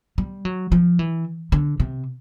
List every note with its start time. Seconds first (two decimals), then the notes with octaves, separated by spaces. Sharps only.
0.18 G3
0.45 F#3
0.72 F3
0.99 E3
1.52 D3
1.80 C3